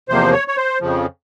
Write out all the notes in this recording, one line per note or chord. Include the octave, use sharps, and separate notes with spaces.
E2 C3 F3 A#3 C5
C#5
C#5
C5
F2 C#3 F3